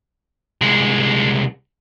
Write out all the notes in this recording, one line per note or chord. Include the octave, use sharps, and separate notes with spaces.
C2 G#3